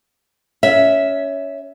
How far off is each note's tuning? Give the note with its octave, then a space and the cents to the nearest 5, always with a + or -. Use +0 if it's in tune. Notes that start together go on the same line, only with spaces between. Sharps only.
C#4 +15 E5 -10